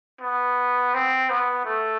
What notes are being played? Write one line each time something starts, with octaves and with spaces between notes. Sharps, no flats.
B3
C4
B3
A3